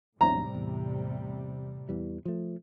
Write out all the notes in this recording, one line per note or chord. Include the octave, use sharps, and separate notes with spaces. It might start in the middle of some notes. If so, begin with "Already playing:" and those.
E1 B1 A2 C3 G3 D4 A#5
E2
E2 E3 G3
F3 A3